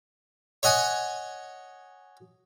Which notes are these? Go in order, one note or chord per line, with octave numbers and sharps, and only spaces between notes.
C#5 D#5 F#5 G#5